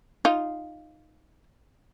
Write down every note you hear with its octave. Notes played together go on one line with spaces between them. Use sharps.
D#4 F4